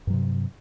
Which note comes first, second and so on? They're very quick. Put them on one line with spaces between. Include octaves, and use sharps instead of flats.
G2 F#3 C3